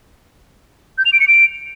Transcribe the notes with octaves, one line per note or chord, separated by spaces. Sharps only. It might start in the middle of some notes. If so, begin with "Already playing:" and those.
G6
F7
D7
C#7
D7